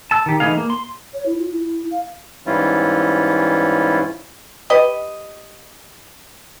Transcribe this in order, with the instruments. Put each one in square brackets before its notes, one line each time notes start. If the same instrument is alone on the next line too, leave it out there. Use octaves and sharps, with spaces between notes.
[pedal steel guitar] A5 E6
D#3 G4
E3 A3 D#4 G#4 F5
A#3
C6
[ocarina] C#5
E4
F4
E4
F5
[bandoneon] G#2 E3 G3 C#4 E4 F4
[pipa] G4 B4 D#5